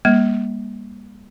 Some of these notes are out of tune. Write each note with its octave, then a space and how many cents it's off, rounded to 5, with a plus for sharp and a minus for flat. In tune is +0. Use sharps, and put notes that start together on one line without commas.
G3 +45 A#3 +30